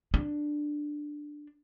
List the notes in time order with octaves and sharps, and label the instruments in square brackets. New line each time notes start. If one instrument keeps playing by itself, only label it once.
[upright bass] D4